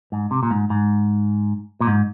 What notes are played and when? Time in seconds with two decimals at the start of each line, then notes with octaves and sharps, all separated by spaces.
0.12 G#2
0.31 C3
0.43 A#2
0.51 G#2
0.70 G#2
1.81 A#2
1.87 G#2